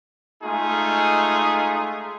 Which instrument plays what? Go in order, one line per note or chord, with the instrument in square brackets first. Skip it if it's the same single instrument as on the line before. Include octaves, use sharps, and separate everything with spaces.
[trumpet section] G#3 A3 D#4 F4 G#4